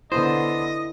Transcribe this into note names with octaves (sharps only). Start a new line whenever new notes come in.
D3 B3 E4 C5 D#5